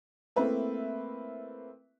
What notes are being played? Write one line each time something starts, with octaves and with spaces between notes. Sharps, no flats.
A3 A#3 C4 E4 B4 E5